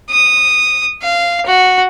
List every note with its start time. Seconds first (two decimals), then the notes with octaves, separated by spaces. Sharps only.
0.10 D#6
1.02 F5
1.46 F#4